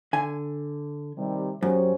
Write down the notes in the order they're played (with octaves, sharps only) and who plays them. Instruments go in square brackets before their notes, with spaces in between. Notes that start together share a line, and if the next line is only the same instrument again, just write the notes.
[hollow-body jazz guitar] D3 G#5
[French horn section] C3 D#3 G3
[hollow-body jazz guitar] F#2 [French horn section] C#4 G4 C5